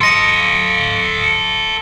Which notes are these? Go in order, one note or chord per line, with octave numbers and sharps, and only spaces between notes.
A4 D#5 C6 A#6 C#7